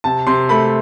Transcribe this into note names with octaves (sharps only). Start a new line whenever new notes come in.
C3 A5
C3 C6
A3 B5